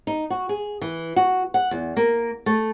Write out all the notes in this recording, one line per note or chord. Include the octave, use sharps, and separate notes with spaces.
D#4
F#4
G#4
E3
F#4
F#5
E2
A#3
A3